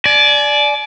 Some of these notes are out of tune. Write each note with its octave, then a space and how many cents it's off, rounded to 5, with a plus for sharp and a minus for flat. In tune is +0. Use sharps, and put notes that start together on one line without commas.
D5 +0 G#5 +35